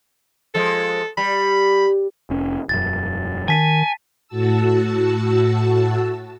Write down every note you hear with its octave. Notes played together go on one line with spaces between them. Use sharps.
F3 G#3 A4
G3 B5
F1 C#4
E1 F#2 A6
D#3 G#5 A5 B6 D#7
A2 F#4 A5 E6